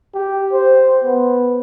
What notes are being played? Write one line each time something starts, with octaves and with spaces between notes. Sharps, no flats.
G4
C5
B3